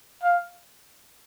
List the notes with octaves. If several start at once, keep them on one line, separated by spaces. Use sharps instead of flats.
F5